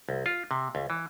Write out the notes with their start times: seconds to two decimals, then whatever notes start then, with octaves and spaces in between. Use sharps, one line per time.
0.09 C2
0.26 F4
0.51 C3
0.75 C#2
0.90 E3